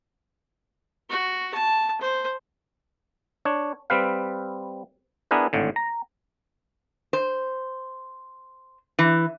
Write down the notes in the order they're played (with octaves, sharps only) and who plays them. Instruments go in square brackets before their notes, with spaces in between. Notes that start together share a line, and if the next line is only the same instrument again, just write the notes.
[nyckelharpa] F#4
A5
C5
[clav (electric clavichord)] D4 C#5
G3 C4 B4 F5
B3 D4 E4 G#4 A#4 B4
G#1 A2 D3
A#5
[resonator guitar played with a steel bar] C5
E3